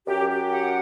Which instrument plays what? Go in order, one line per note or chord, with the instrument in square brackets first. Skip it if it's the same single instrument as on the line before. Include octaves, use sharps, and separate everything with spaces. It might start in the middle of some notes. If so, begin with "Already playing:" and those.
[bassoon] F#2 [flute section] G4
[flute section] G4
F#5